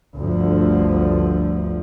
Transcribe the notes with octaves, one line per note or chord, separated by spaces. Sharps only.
G1 D2 G2 F3